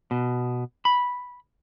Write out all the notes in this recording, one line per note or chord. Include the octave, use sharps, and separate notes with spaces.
B2
B5